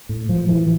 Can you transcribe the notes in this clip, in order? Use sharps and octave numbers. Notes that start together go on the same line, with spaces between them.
A2
A2 F3
A2 E3